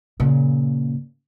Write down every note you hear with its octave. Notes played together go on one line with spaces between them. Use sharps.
A#2 C#3